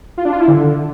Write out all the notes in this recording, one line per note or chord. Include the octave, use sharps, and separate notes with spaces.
F4
D4
F4
E4
D3